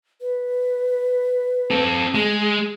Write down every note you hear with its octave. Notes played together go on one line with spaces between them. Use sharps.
B4
C4 A4
G#3 G#4